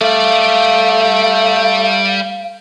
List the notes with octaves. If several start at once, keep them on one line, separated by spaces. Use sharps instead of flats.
G3 A3 D5 F5